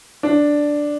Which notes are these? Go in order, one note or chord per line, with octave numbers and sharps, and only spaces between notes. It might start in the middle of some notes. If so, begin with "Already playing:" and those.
D4